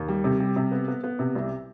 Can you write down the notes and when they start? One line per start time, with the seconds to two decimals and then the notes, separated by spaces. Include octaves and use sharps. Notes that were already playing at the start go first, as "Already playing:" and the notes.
Already playing: D#2
0.08 G3
0.24 C3
0.40 G3
0.56 C3
0.72 B3
0.88 B3
1.04 B3
1.19 C3
1.35 C2